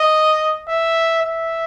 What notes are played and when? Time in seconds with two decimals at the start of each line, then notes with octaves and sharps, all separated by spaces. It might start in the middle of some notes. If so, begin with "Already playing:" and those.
Already playing: D#5
0.69 E5
1.22 E5